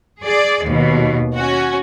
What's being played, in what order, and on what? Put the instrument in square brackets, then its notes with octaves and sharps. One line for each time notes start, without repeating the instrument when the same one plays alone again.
[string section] G#4 D5
D#2 B2
C#4 F#4